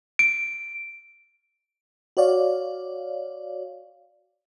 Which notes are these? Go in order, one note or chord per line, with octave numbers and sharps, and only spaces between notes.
D7
F#4 C#5 D5 F5